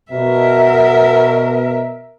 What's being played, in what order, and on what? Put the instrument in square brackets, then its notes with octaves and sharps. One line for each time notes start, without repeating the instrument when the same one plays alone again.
[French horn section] B2 [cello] A#4 E5